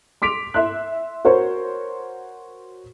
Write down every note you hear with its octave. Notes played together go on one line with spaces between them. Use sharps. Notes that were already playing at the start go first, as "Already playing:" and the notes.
C6 D6 B6 D7 F7
E5 C6 F#6
F#4 A#4 C5 C#5